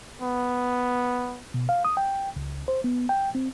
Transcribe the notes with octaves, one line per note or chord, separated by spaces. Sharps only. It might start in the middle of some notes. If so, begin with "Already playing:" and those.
B3
B2
F5
D#6
G5
C#2
C5
B3
G5
C4